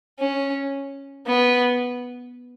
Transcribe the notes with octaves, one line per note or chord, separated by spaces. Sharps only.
C#4
B3